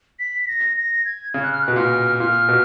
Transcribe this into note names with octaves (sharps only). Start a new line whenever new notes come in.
B6
B6
A#6
A#6
G#6
C#3 G#6
F#6
F6
F#6
B2
A#2 F6
A#2 F6
B2